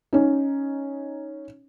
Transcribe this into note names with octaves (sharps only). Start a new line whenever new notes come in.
C#4 D#4